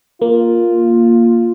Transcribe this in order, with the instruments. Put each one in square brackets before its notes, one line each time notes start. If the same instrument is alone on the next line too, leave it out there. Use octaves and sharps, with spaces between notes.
[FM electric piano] A#3 [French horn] F4